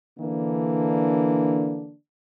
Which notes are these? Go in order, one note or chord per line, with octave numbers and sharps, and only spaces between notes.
D3 E3 A#3 D4